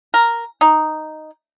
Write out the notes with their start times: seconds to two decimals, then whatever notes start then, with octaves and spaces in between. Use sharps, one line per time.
0.14 A#4
0.61 D#4